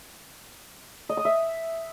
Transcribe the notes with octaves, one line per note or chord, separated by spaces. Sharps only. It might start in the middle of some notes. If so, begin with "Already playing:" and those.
D#5
D#6
E5